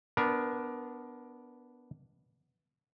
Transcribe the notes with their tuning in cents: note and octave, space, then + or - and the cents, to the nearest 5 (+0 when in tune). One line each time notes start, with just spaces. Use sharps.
B3 +0 D4 -5 A#4 +20